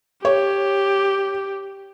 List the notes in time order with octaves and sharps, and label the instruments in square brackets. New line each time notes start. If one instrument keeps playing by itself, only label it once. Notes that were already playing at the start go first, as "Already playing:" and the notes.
[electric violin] G4 [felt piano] C#5